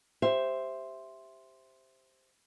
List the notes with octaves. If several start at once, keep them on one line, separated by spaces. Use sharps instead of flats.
G4 C5 E5